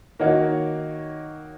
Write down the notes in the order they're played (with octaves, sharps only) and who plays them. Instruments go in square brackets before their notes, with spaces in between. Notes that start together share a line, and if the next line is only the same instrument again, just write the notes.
[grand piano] D#3 A#3 D#4 F#4 C#5